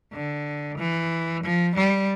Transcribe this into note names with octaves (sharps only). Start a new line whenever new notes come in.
D3
E3
F3
G3